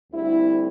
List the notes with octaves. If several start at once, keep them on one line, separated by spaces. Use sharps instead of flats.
D2 D3 G3 C4 E4